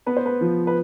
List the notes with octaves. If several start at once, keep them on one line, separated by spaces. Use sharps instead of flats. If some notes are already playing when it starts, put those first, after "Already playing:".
B3 B4
C5
B4
F3
B4